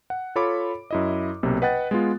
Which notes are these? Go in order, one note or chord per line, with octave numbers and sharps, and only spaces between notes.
F#5
F4 A4 C#5 B5 D6
F#2 E4 D#5
B1 C3 A#3
B4 D#5 F#5 G5 F#6 A6
G#3 B3 F4